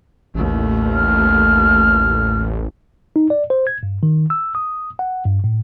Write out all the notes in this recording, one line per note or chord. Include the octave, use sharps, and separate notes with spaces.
A1 D#2 A3
F6
D#4
D5
C5
G#6
G2
D#3
E6
D#6
F#5
G2
A2